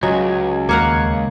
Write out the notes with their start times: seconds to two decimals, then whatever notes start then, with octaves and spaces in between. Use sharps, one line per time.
0.03 C#2 F#3 D#5 G#5 G#6
0.69 D#2 A#3 F5 F#5 G#6 C#7